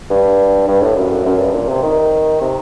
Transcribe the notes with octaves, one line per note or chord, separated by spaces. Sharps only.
G2
G2
A2
F#2
F#2
G2
A#2
C3
D#3
C3